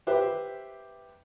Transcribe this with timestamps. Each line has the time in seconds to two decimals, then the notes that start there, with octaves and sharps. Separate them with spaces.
0.07 G4 B4 C5 E5